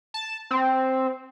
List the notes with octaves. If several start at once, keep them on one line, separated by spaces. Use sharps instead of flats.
A5
C4